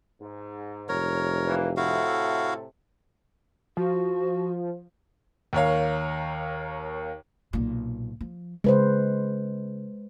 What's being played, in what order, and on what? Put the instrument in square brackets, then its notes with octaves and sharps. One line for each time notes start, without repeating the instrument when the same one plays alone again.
[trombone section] G#2
[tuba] F1 [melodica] A#4 C#5
[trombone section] E3 A#3
[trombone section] A2 C3 A4 [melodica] E4 F#4 F5
[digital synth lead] F3 [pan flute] F#4
[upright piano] D#2 A#4 C#5 F5
[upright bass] B1 A#2
F3
[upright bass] C#3 [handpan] G#3 B4 C5